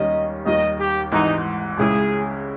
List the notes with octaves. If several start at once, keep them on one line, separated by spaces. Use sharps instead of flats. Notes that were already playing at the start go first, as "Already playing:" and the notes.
Already playing: D#2 D#3 G3 C#4 D#5
D#2 D#3 G3 D#5
G4
G#1 G#2 E3 D#4
C#2 C#3 G#3 C#4 E4 G#4